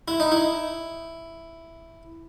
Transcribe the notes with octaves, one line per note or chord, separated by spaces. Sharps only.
E4
D#4
E4